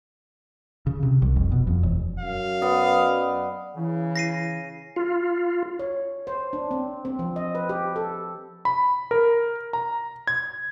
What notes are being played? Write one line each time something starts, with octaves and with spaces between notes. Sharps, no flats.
C#3
C3
C2
F1
B2
F2
E1
F#2 F5
B3 D5 D#5
C#3 E3
A#6 C7 D#7
F4
C#5
C5
D4
C4
C4
F3
D#5
B4
G4
A4
B5
A#4
A#5
G#6